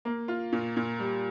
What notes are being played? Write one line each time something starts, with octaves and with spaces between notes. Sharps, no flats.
A#3
F4
A#2
A#2
G3